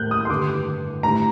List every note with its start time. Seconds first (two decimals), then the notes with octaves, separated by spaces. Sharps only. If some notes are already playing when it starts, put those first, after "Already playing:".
Already playing: A2 G3 A#3 F#6 G6
0.11 D#6
0.25 C6
0.30 G2 D3 G3 D6
1.03 A2 G3 D4 A#5